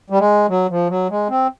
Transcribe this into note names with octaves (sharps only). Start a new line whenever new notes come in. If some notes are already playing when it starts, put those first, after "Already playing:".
G3
G#3
F#3
F3
F#3
G#3
C4